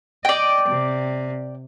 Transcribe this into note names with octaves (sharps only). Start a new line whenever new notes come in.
D5 D#5 G5
C3